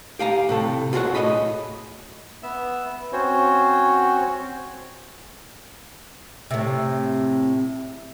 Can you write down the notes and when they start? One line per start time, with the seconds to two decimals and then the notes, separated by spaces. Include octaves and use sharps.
0.19 G4 F5 G#5 A#5
0.49 A2 C3 A4
0.93 F4 F#4 G#4 C5 C#5 F#5
1.15 A2 C#5 D#5 G#5 B5
2.43 B3 E5
3.13 C4 C#4 F#4 C5 C#5
6.51 A2 C3